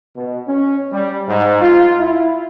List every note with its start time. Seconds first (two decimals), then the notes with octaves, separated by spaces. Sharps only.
0.16 B2
0.48 C#4
0.92 G3
1.27 G#2
1.61 F4
1.99 E4